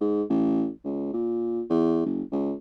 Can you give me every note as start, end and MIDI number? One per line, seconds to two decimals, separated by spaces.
0.01 0.23 44
0.30 0.69 33
0.85 1.09 37
1.13 1.62 46
1.70 2.04 40
2.06 2.22 30
2.32 2.53 37